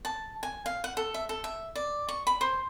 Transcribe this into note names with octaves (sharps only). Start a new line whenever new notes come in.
A5
G#5
F5
F#5
A4
E5
A4
E5
D5
C#6
B5
C5